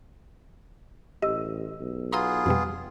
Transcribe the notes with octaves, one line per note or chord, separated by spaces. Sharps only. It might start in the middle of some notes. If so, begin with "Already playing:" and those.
A1 G4 D#5 E6
B1
B3 F4 G#4 A#5 C6 D#6
F2 B2 G3